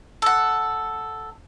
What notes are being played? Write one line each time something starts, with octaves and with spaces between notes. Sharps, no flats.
A4 F#5